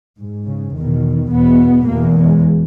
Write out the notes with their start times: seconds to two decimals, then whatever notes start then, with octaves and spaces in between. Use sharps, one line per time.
0.19 G#2
0.46 C#3
0.74 E2 B2 D#3
1.30 E2 B2 B3
1.87 E2 B2 A#3
2.16 G#3